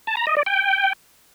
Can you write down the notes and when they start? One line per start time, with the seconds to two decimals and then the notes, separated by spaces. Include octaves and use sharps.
0.07 A5
0.17 A#5
0.27 D#5
0.37 D5
0.46 G5